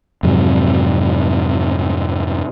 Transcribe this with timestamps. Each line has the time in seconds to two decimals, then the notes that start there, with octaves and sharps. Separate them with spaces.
0.23 F2 G#2 C3 F#3